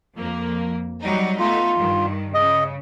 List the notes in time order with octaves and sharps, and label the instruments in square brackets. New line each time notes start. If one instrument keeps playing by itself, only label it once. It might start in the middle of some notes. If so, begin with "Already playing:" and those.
[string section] F2 A#3
F#3 G3 D#4
[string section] A3 B3 D#4 [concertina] F4
[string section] G2 D#3
[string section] C#3 [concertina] D#5